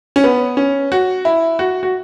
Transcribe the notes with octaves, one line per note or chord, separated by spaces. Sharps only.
C#4
B3
C#4
F#4
E4
F#4
F#4